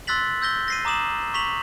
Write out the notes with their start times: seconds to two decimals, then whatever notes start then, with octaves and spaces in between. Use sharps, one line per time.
0.07 C6 E6 F#6 A6 B6 F#7
0.42 E6 G6 A#6 G7
0.68 A#6 C7 D#7
0.85 A#5 D6 D#6 E7 F#7
1.34 C#6 B6 F7 F#7